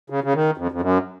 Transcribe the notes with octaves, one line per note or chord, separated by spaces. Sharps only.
C#3
C#3
D#3
F2
F2
F#2